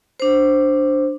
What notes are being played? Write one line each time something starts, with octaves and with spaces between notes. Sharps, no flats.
D4 C5